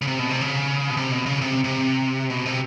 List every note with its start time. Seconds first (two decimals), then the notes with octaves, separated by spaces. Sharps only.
0.02 C#3
0.07 C3
0.19 B2
0.30 C3
0.41 C#3
0.90 B2
0.97 C3
1.11 B2
1.26 C#3
1.41 C3
1.64 C3
2.30 B2
2.46 C3